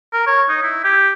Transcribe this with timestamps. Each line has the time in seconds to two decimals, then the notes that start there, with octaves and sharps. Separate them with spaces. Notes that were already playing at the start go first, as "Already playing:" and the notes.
0.13 A#4
0.27 C#5
0.49 D#4
0.63 E4
0.84 G4